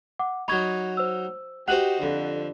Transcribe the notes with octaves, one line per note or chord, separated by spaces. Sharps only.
F#5 D6
F#3 D#4 B5 C#6 G#6
C5 E6
D#4 F#4 G4 C5 F#5 F#6 F#7
F2 D3